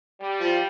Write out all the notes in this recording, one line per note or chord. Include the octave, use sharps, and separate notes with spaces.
G3
F3